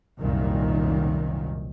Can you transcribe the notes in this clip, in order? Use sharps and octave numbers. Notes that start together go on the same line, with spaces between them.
F1 C2 F#2 A#2 D#3